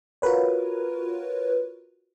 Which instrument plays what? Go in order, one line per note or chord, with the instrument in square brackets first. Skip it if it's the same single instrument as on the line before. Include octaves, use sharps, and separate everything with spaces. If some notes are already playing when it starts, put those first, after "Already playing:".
[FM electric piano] F4 F#4 A#4 B4 C#5